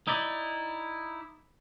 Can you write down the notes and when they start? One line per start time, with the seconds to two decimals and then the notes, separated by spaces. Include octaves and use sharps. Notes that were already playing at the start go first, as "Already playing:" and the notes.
0.07 D#4 E4 D5